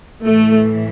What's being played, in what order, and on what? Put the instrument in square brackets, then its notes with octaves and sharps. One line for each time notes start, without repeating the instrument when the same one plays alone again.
[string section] A2 E3 A3